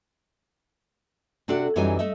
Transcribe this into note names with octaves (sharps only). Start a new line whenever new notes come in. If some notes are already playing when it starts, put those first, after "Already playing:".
C3 D4 F#4 A4 D5 F#5
F#2 E3 F#3 G3 D#4 G#5
A3 D#5 E5